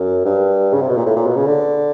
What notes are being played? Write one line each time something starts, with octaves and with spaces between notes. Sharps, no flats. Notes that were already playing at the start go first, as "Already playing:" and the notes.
Already playing: F#2
G2
C#3
C3
B2
A#2
A2
A#2
B2
C#3
D3